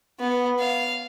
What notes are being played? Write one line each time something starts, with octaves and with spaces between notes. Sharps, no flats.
B3
F5